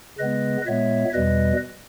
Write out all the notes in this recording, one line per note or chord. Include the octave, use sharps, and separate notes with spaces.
C#3 G#3 B3 B4 D#5
A#2 G#3 B3 C#5 E5
E2 B2 G3 B4 D#5